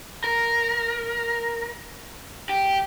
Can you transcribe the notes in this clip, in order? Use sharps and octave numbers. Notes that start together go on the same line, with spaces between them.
A#4
G4